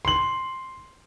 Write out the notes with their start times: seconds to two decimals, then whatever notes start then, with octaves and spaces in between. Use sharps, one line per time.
0.05 C6 F#7